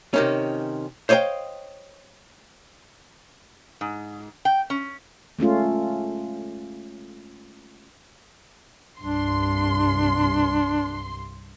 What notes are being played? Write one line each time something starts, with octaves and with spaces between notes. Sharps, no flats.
C3 D#3 C#4
C5 C#5 D#5 F5 G5
G#2
G5
C#4
G#3 A3 C#4 F4
C2 G2 D4 C6